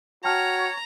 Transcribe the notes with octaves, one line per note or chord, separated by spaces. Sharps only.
F#4 C#5 G5 A5 A#5 F6